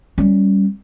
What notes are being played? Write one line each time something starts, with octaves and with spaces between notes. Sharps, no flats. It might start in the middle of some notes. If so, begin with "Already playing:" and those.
G3 C#4